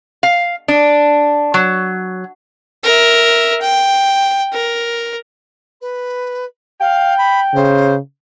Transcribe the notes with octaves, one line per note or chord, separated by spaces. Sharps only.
F5
D4
F#3
A#4 E5
G5
A#4
B4
F5 G5
B5
C#3 C5